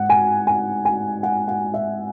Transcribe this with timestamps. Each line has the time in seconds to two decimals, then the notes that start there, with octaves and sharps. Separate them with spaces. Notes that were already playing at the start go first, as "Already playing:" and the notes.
Already playing: G#2 F#5
0.10 G#5
0.47 G#5
0.85 G#5
1.23 F#5
1.48 F#5
1.74 E5